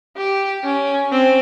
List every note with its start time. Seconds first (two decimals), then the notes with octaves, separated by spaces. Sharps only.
0.17 G4
0.64 C#4
1.12 C4